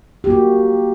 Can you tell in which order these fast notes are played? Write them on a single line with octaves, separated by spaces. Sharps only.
G4 A#3 F#4